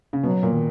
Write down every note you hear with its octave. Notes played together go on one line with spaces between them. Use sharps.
C#3
B2 F#3
A#2
D#3